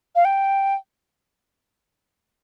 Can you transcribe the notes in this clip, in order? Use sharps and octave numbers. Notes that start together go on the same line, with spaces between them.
F5
G5